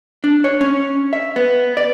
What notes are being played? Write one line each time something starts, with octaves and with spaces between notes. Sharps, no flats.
D4
C#5
C#4
E5
B3
D5